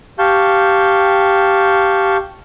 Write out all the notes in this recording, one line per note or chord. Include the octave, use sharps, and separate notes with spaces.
G4 F5 A5 C#6 G6